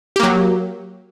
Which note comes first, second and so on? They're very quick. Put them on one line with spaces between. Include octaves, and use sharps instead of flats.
G4 A#3 F#3